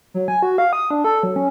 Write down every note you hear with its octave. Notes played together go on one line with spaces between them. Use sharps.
F#3
G#5
F#4
F5
D#6
D4
A4
F#3
C#4